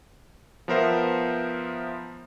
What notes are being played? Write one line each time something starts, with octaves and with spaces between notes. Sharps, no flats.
F3 B3 A#4 C5 E5